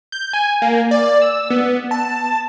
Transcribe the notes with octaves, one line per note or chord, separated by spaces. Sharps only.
G6
G#5
A#3
D5
E6
B3
A5